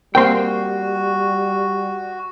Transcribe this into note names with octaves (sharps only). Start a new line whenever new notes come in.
G3 A#3 C4 F#4 A#4 G5 C6